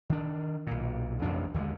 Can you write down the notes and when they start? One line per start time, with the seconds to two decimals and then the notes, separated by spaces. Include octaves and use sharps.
0.10 D#3 D4
0.67 B1 A#2
1.22 A1 F2 C3 D4
1.54 D#2 D3 D#3 G#3